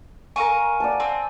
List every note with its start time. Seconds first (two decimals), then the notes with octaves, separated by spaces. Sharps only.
0.36 A#4 F5 G#5 C#6 D#7
0.80 D5 F#5 A5
1.00 C4